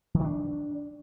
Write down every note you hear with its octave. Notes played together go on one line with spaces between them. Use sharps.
E3
D#3
D4